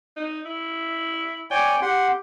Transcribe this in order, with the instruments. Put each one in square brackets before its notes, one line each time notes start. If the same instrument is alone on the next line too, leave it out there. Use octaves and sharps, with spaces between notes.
[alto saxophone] D#4
E4
[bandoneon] C#5 D5 G#5 [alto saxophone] G5
[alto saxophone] G4 [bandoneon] F#5 C6